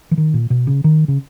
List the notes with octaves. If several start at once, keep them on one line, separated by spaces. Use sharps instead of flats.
E3
D#3
A#2
B2
C#3
D#3
C#3